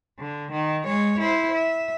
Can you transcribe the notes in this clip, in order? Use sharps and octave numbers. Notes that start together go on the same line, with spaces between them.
D3
D#3
G#3 C#5
E4 C5
E5